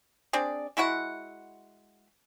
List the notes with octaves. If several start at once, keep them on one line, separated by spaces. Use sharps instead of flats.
C4 D4 G#4 D5
G#3 E4 F#4 F#5